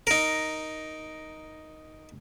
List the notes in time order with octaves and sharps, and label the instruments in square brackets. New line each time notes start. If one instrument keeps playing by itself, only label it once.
[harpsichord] D#4 A#4